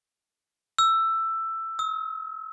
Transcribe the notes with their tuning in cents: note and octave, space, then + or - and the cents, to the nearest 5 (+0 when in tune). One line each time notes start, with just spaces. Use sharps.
E6 +10
E6 -45